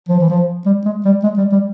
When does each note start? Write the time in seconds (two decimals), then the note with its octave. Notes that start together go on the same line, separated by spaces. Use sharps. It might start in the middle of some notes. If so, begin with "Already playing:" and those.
0.09 F3
0.20 E3
0.30 F3
0.66 G3
0.85 G#3
1.05 G3
1.23 G#3
1.38 G3
1.52 G3